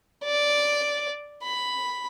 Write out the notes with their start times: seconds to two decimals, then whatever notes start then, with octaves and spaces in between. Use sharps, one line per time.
0.24 D5
1.43 B5